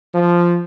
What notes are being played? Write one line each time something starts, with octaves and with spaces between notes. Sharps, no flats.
F3